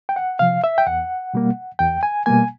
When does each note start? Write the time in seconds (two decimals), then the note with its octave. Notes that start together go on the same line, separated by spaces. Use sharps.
0.09 G5
0.16 F#5
0.39 C3 F3 F5
0.64 E5
0.78 G5
0.87 E2 F#5
1.34 B2 G3 A#3
1.79 E2 G5
2.03 G#5
2.26 B2 G3 A#3 G#5